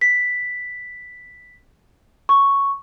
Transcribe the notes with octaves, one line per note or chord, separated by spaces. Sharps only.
B6
C#6